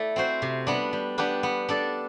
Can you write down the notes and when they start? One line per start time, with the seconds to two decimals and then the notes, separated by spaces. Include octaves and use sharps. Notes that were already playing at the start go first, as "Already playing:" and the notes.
Already playing: A3 E4 D5
0.16 C4 F#4 C5
0.42 C3
0.67 G3 B3 D4
0.93 G3
1.18 B3 D4 G4 B4
1.43 B3
1.69 D4 A4 D5